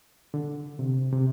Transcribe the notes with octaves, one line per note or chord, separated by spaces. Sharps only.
D3
C3
C3